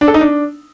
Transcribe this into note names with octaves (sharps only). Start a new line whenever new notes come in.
D4
A4
D#4
D4